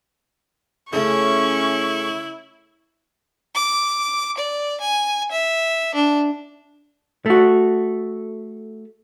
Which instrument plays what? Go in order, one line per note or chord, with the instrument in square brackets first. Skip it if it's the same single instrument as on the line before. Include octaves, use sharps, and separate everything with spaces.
[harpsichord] C#3 A3 [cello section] C#4 [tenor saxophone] E4 [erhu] C#6
[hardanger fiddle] D6
D5
G#5
E5
D4
[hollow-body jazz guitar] A3 F#4